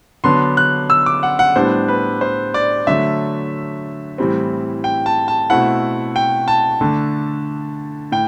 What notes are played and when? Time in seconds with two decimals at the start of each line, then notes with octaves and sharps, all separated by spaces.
0.24 D3 F#3 B3 D4 C6
0.57 F#6
0.90 E6
1.06 D6
1.23 F#5
1.39 F#5
1.56 A2 G3 B3 D4 C5
1.88 B4
2.21 C5
2.54 D5
2.87 D3 F#3 A3 E5
4.18 A2 E3 G3 C4
4.84 G5
5.06 A5
5.28 A5
5.50 B2 A3 C4 E4 F#5
6.16 G5
6.48 A5
6.81 D3 A3 D4
8.12 A2 G5